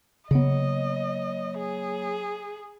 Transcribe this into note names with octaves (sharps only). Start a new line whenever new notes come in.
C#3 F#3 A#3 B3 C#5 D#5
G#4